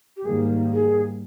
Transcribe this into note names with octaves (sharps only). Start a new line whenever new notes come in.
G4
G#2 D#3 G3 A#3 G#4
G#4